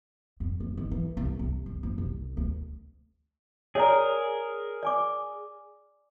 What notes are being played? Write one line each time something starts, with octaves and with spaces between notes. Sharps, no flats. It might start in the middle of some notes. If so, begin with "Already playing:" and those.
F2
F#1
D#3
E3
C2
C2
E2
F#1
C2
D2
G#4 A#4 C#5 D5 A#5
D5 G#5 D6